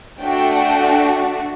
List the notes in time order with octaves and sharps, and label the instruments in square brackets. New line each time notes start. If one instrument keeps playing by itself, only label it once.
[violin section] A3 D4 F#4 G5